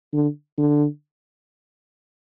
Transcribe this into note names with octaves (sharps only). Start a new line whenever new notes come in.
D3
D3